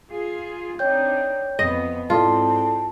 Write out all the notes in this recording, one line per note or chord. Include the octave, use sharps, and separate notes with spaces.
F4 G#4
C4 D4 D#4 C#5 G5 G6
F2 F3 B3 D#5
G#2 C4 E4 F4 A4 D5 A5